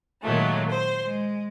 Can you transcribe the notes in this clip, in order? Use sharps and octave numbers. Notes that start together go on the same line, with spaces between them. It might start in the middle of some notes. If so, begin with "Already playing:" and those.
A#2 D#3 F#3 G#3 A3
C5
G#3